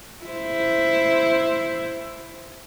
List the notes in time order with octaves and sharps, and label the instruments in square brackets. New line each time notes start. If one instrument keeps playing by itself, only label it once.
[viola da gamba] E4 C5